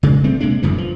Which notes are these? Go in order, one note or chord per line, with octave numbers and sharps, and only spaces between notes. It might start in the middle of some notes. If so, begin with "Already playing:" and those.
C#3 G#3
G3 A3 C4
C3 G#3 A#3 D4
A1 F#2 D3 E3
F3